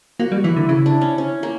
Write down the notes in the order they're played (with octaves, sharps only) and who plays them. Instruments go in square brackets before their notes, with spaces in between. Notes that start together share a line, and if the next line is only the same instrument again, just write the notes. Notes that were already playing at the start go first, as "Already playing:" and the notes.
[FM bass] A#3 [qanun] F#4
[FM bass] G3
[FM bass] E3 [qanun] E4
[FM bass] D3
[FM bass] C#3 [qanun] E4
[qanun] D4
C#4
C#4
A#3